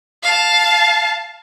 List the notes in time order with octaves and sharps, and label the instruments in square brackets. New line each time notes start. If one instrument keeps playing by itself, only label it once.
[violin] F5 A5